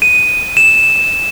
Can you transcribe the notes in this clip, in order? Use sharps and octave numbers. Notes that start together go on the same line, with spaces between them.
D#7
E7